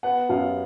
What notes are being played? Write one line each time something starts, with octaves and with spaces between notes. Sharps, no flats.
B3 F#5
F#2 F5